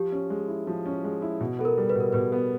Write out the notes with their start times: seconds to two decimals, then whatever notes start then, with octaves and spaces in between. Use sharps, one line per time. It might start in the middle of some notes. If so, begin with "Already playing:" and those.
Already playing: F3 G4
0.12 C#4
0.30 G#3
0.48 E4
0.67 F3
0.86 C#4
1.04 G#3
1.22 E4
1.40 B2
1.59 B3 A4
1.65 A#4
1.77 G3
1.89 B4
1.95 B2
2.00 A#4
2.13 B2 B4
2.32 B3